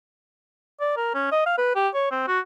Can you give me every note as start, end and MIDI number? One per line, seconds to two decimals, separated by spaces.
0.80 0.94 74
0.97 1.11 70
1.14 1.31 61
1.32 1.41 75
1.46 1.55 77
1.58 1.72 71
1.76 1.88 67
1.94 2.09 73
2.11 2.27 60
2.28 2.39 66